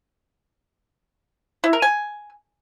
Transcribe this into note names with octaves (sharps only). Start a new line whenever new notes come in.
E4
A#4
G#5